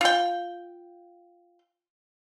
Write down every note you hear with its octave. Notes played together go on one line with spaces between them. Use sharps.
F4 G5